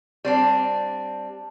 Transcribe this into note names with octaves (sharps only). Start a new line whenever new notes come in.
G3 C4 D4